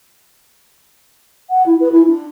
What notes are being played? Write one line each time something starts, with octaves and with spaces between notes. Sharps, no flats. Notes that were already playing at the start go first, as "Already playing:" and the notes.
F#5
E4
B4
E4
D4